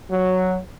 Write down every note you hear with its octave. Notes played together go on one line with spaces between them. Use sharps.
F#3